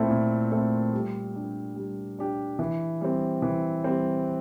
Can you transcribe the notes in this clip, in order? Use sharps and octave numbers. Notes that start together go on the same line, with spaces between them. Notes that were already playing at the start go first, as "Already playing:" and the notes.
Already playing: A#2 A3 C4 E4 A4
A#2
A3 C4 E4 A4
G3
D4 G4
G3
D4 G4
E3
G3 C4
E3
G3 C4